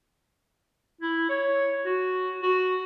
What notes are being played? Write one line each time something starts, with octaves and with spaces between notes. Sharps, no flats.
E4
C#5
F#4
F#4